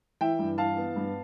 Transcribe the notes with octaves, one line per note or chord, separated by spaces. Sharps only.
E3 E5 G5
G2
E3 F5 A5
B3
G2